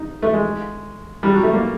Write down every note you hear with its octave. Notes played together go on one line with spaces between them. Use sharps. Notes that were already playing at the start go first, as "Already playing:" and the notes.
Already playing: D#4
A3
G#3
G3
F#3
A3
A#3